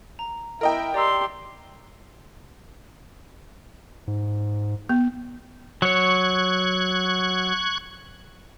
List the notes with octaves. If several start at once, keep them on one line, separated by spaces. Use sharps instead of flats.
A#5
E4 A#4 D#5 G5
G4 D5 A#5 C6 E6
G#2
B3
F#3 C#5 C#6 F#6 G#6